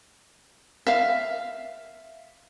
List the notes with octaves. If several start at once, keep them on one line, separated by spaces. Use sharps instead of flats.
E5 F5